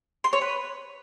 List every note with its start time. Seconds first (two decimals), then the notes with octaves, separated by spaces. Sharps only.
0.24 C6
0.33 C#5
0.41 B4